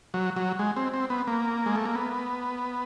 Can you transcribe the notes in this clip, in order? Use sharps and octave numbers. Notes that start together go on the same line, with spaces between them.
F#3
F#3
G#3
C4
C4
B3
A#3
G#3
A3
A#3
B3